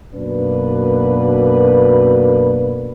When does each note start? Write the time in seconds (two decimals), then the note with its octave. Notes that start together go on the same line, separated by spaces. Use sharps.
0.14 F#2 B2 A#3 D4 B4